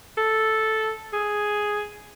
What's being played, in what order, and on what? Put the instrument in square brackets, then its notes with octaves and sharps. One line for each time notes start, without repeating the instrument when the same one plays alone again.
[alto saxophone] A4
G#4